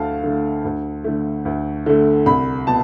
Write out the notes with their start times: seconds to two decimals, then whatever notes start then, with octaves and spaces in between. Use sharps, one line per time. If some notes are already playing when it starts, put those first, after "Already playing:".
Already playing: D2 D3 A3 F5 A5
0.23 D3 A3
0.65 D2
1.04 D3 A3
1.45 D2
1.86 D3 A3
2.26 C2 B5
2.67 B2 A5